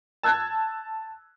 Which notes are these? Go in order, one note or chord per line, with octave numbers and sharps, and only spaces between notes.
A5 E6 F#6 G#6